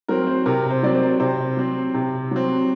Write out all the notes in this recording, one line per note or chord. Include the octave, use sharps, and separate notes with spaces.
F#3 C4 A#4
C5
C3 A#4
C5
F#3 C4 D5
C5
C3 C5
F#3 C4
C3
F#3 C4